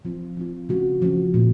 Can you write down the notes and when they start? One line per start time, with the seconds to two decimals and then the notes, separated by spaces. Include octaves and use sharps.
0.05 F3 C4 F4
0.37 F3 C4 F4
0.69 C#3 F3 A3 C#4 F#4
1.01 C#3 F3 A3 C#4 F#4
1.34 A#2 F3 A3